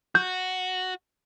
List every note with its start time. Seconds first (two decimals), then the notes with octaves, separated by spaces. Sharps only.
0.15 F#4 G6